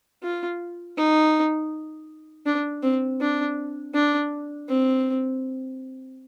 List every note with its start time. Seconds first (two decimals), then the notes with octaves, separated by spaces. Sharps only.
0.23 F4
0.97 D#4
2.46 D4
2.83 C4
3.20 D4
3.94 D4
4.68 C4